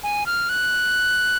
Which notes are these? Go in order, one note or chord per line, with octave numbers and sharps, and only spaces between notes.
G#5
F6
F#6